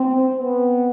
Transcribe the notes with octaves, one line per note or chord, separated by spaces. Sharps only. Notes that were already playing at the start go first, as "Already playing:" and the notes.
Already playing: C4
B3